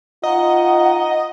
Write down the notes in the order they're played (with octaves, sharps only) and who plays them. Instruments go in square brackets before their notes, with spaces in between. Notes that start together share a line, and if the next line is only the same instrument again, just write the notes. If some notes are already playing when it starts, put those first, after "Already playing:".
[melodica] D#4 [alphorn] F4 [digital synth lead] D#5 [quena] F#5